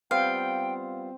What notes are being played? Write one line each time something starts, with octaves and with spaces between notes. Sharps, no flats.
G3 B3 C4 F4 F5 G5